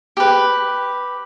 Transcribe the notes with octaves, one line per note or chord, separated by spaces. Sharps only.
G4 B4